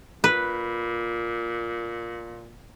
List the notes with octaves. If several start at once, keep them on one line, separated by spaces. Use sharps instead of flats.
A#2 B4